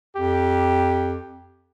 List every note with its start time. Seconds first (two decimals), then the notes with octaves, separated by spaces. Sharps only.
0.16 F2 G4